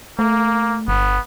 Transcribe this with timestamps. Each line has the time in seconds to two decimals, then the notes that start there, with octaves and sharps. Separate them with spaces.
0.19 A3 A#3
0.88 G1 B3